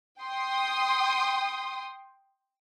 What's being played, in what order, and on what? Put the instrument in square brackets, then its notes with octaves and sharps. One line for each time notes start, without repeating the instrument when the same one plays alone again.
[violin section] G5 C6 D#6